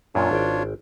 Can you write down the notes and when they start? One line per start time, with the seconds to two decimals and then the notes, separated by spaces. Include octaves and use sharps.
0.15 F#2 A#2 D4 F4 C#5
0.31 G#1 G5